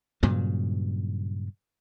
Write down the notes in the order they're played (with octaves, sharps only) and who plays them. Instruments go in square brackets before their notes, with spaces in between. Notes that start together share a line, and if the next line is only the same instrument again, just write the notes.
[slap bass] G2 A#2 C#3 F#3